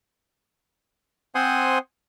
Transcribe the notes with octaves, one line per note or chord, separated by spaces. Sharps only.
C4 C5 F#5 G#5 C6 D#6